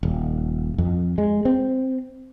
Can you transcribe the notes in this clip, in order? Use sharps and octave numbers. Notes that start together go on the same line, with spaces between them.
D#1
F2
G#3
C4